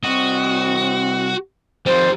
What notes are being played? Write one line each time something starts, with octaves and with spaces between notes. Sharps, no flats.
C2 C4 F#4 D#5
F2 D#3 G3 C5